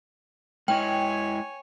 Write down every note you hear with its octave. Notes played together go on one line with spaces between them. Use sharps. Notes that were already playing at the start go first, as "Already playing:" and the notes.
G#3 E4 C#5 D#5 G5 G#5